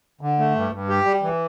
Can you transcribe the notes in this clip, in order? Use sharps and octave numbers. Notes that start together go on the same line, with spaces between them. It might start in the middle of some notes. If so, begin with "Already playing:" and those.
D3
A3
G2
G2
G4
G3
E3